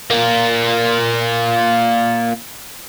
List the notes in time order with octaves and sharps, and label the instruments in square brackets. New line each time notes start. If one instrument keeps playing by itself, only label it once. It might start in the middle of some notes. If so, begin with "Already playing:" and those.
[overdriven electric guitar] A#3 F4